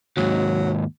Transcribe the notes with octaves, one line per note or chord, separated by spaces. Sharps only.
D#2 G#2 F#3